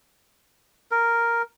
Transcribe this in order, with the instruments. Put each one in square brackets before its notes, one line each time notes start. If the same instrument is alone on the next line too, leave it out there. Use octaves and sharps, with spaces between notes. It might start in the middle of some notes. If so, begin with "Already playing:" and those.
[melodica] A#4